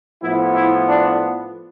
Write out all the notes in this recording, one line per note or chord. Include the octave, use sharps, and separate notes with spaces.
A2 F3 B3 E4
E4
D4